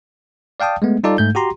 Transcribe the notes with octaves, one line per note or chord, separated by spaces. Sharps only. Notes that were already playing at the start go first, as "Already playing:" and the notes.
D5 F5 G5 A5 D#6
G#3 A3 B3
G3 D#4 F4 A4 D5
G#2 A3 G6
F#4 G4 A#5 C6